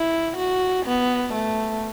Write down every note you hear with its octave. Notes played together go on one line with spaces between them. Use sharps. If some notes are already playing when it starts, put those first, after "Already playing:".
Already playing: E4
F#4
B3
A3